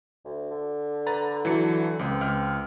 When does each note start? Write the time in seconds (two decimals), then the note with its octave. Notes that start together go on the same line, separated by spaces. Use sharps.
0.25 D2
0.51 D3
1.06 B4 A#5 A6
1.45 E3 F#3 C#7
1.99 C#2 C4
2.21 C#2 F6